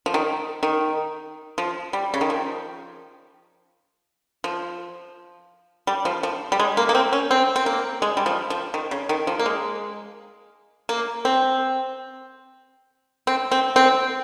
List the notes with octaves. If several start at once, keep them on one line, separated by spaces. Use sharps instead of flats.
F3
D#3
D#3
F3
G3
C#3
D#3
F3
F3
G3
F3
F3
G3
G#3
A#3
A#3
C4
C#4
C4
C4
A#3
G#3
G3
F3
F3
D#3
C#3
D#3
F3
A#3
G#3
A#3
C4
C4
C4
C4